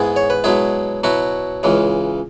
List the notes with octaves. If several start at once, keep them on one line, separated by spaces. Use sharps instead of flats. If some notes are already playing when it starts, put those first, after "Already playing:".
Already playing: G#2 G#3 B3 E4 G#4
C#5
B4
B2 F#3 G#3 E4 G#4
B2 F#3 E4 F#4
C#2 C#3 E3 G#3